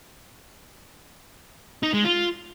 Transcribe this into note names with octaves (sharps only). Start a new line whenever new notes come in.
D#4
G#3
F4